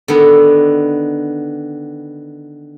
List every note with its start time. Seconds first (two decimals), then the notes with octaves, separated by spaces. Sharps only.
0.08 D3 D#3 B3